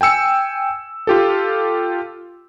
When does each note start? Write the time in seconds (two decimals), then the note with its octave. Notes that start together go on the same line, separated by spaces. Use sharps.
0.01 G5 G#5 E6 C#7
1.07 F4 G4 A4